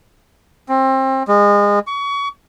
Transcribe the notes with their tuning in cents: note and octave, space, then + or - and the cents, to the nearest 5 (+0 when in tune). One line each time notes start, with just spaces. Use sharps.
C4 +25
G#3 -25
C#6 +30